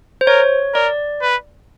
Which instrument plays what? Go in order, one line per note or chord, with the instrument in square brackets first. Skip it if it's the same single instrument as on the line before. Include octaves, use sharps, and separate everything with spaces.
[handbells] C5
[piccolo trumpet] A#4 [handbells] C#5
[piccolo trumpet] A#4 [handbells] D5
[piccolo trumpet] B4